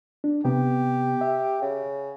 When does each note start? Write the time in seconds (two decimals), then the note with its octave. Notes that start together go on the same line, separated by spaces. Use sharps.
0.24 D4
0.45 C3 B3 G4
1.21 E5
1.62 C#3